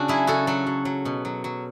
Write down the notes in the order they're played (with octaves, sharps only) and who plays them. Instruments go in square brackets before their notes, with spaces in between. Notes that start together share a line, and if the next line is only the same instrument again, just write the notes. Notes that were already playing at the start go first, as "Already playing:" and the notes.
Already playing: [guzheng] C#3 D4 F#4
F#3 E4 G#4
C#3 F#4 A4
F#3 F#4 A4
F#3
F#3
B2
F#3
F#3